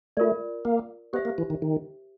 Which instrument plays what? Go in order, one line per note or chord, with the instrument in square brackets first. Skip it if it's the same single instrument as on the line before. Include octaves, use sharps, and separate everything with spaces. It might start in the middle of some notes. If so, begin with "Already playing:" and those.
[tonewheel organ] A3 [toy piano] F4 A#4 D5
[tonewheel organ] A#3
[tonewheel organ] B3 [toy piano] G4 C5 E5
[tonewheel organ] A#3
E3
D#3
D#3